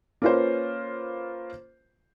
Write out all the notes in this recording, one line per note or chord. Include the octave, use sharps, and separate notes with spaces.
A#3 C#4 F4 B4 C5